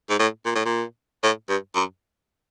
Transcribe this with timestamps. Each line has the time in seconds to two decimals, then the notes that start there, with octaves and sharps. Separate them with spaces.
0.10 G#2
0.19 A2
0.45 A#2
0.55 A2
0.65 A#2
1.23 A2
1.49 G2
1.75 F#2